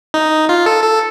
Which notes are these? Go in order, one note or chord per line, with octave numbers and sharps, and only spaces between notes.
D#4
F4
A4
A4